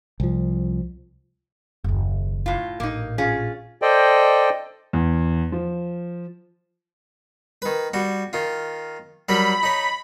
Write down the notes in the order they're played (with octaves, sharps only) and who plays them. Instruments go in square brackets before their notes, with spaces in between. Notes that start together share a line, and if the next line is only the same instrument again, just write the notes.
[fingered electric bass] C2 F3
[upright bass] F#1 D#2
[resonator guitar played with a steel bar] A2 F4
[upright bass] A1 A#2 [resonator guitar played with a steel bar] A#3 D#4
[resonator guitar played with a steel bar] C#4 F4 G#4
[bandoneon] A4 C5 D5 D#5 G5
[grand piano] E2
F3
[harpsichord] D#3 B4
G3 F#4
D#3 F4
[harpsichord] F#3 G3 A#4 [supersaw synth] B5
[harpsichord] D#4 C#5